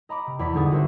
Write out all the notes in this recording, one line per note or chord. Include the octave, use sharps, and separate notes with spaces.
D#5 A#5 B5 D6
C3
E2 D5 B5 B6
C2 G#2 D3 G#4 D#6 A6
F#4 A#4 C5 E5